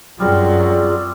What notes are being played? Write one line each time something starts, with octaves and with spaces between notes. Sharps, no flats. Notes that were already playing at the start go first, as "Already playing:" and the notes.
F#2 F#3 G3 C4 F4 G#4 D5